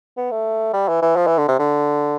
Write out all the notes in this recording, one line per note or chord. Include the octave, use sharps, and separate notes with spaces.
B3
A3
G3
E3
E3
F3
E3
D3
C3
D3